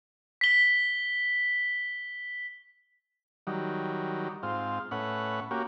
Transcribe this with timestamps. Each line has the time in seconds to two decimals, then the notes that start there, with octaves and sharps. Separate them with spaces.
0.41 B6 G7
3.47 D#3 F#3 G3
4.43 G#2 C4 F4
4.91 A2 C#4 B4 F#5
5.51 A#3 C#4 F#4 G4